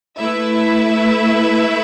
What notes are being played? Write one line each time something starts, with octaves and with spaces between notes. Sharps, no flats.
A3 E4 B4 E5